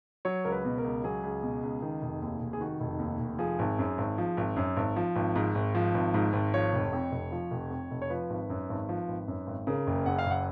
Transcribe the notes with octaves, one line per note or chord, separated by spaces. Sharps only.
F#3 C#5
C#2 A#4
B4
B2
A#4
C#2
F#3 G#4
C#2
B2
C#2
D#3
F1
D#2
F1
G#4
D#3 F#4
F1
D#2
F1
F3 G#4
G#1
F#2
G#1
F3
G#1
F#2
G#1
F3
G#1
G#2
G#1
F3
G#1
G#2
G#1
F3 C#5
F1
F2
F1
F3
F1
F2
F1
C#5
F3 B4
G#1
F#2
G#1
F3
G#1
F#2
G#1
C#3 A#4
F#1
F#2 F#5
F5
F#1 F#5